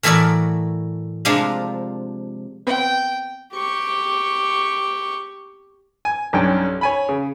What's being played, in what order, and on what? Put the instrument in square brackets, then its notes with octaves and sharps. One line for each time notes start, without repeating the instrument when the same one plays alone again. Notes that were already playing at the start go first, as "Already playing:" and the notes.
[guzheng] A2 E3 F#4 A4 A#4 D5
C3 F3 G#3 D4 A#4 F5
[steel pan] B3 C4 B4 [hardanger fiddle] G5
[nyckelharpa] G4 C#6
[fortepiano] G#5
B1 G2 C#4 G5
C#5 G#5 B5
C#3